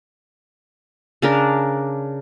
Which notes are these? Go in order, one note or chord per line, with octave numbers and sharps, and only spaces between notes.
C#3 D4 A#4